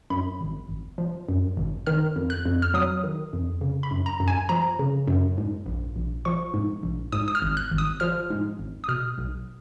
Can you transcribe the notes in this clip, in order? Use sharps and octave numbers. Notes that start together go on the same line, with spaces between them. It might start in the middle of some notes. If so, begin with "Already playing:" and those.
F#2 B5
G#1
G#1
F3
F#2
G#1
D#3 F6
F2
F#6
F2
F6
F#3 D#6
D#3
F2
C#3
B5
F#2
A#5
F#2
G#5
F3 A#5
C#3
F#2
G#2
A#1
A#1
F3 C#6
G#2
A#1
G#2 D#6
D#6
F6
G#1
F#6
G#1
D#6
F3 F6
G#2
G#1
D#6
B2 F6
B1